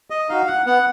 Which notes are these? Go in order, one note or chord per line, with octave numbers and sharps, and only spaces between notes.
D#5
D#4 F#4 F5
F#5
B3 F#5